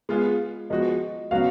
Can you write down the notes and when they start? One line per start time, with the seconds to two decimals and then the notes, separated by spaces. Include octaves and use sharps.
0.09 G#3 B3 F4 G#4
0.70 F3 G#3 B3 F#4 D#5
1.31 C#3 F#3 B3 F#4 F5